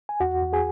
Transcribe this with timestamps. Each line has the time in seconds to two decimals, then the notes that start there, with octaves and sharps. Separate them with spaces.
0.09 G#5
0.20 E2 F#4 F#5
0.43 E2
0.53 G#4 G#5